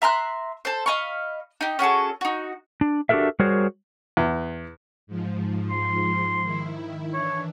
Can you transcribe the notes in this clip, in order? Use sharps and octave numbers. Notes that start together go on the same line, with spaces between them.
E5 A#5 C6 F#6
A4 C5
D#5 F5 B5 C#6
D#4 G4
C#4 F#4 G#4 A4
D#4 F#4
D4
D4 F#4 G4 A4 A#4 E5
G3 F#4 G#4 A#4 C5 C#5
E2
G#2 F3
C6
D#3 E4
E3 D4 C#5